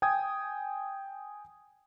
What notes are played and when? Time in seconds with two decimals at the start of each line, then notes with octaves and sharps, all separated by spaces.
0.02 G5 G#5 D#6 G#6